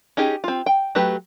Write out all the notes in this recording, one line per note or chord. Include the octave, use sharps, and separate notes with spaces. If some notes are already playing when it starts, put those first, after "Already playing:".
C#4 D#4 G4 G#4
C4 F4
G5
F#3 A3 G4 B4